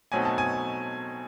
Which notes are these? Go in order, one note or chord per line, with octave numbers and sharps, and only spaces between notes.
B2 F#3 A3 C4 D#4 G#5
A5
G#5